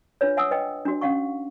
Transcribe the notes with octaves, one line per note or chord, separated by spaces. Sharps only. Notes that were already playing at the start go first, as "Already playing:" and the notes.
D4 F4 B4 C#5
E5 F#5 G#5 D#6 E6
B4 D#5 G5
D4 F#4
C#4 F5 F#5 C#6